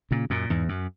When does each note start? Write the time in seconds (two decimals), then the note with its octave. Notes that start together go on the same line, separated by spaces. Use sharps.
0.11 A#2 C#3
0.30 F#2 A#2
0.50 E2 G#2
0.69 F#2